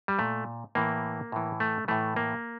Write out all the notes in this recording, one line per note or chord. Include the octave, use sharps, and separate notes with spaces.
G3
A#2 A3
A2 E3 A#3
A2 E3
A3
A2 E3 A3
A#3